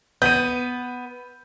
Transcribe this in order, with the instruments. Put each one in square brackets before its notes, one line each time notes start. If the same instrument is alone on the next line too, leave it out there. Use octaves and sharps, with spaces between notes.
[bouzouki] B3 [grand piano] G6 D#7